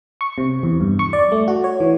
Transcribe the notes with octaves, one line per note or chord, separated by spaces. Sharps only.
C#6
C3
E2
G2
C#6
D5
A3
F#4
C#5
E3